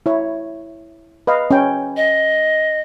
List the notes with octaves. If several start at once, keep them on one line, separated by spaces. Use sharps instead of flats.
E4 C#5
B4 D#5 F5
C#4 G5
D#5